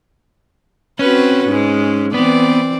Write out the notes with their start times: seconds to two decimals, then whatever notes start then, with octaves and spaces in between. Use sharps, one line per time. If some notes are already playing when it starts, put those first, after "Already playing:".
0.99 C4 C#4 F#4 B4
1.48 G#2 G#3
2.14 E3 B3 C4 D5